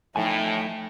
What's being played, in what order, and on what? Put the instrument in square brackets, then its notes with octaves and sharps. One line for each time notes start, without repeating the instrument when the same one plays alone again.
[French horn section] A2 [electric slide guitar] F3 A3 G#5 [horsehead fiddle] D#4 G5